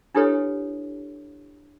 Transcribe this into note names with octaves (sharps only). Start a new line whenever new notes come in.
D4 E4 G4 A4 B4 C#5